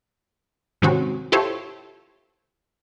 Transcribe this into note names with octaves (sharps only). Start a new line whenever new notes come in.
G#2 C3 D#3 C4 C#4 F#4
E4 F4 G4 A4 C5 C#5